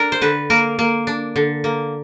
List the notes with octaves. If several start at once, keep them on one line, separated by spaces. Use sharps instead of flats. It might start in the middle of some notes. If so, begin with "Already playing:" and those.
Already playing: D4 A#4
C5
D3 B4
A#3 A#4
A#3
D4
D3
A#3